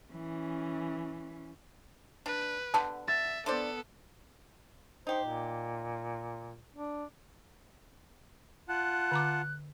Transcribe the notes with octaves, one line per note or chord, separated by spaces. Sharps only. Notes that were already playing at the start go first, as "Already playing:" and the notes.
E3 C#4
D4 B4
D3 B3 G4 A5
E5 A6
B3 D4 A4 C5 D5
D#4 G4 C5
A#2
D4
F4 F#5 A5 F#6
D3 A#5 D6